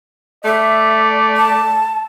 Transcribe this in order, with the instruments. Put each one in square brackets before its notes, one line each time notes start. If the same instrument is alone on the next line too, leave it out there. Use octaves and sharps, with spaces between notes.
[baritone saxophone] A3 [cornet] D5 [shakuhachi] E5
[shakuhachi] A5